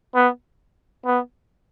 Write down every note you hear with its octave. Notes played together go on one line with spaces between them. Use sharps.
B3
B3